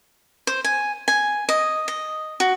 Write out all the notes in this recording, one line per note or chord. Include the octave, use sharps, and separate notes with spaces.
C5
G#5
G#5
D#5
D#5
F#4